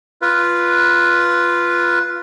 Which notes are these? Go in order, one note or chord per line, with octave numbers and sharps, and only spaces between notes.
F4 B4